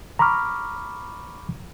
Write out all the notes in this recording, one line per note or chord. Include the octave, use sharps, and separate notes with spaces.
A#5 B5 C#6 D6 F6